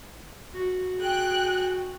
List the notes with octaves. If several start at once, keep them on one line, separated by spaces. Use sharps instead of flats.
F#4
G#4 G5 F#6